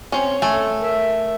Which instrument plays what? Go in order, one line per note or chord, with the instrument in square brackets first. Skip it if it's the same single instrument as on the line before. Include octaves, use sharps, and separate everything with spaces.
[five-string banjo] C4 C#4 [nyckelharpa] C#5
[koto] A3 [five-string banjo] G#5
[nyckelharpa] A#4 E5